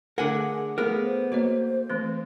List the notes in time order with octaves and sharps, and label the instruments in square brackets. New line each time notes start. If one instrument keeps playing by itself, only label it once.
[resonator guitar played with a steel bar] D3 F#5 [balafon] A3 [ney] G#4 [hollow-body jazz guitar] A#4 G#5
[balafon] A3 G#4 [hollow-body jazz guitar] B3 A#4
[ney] C5
[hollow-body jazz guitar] A#3 [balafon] F#4 C#5 D#5
[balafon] E3 A3 C4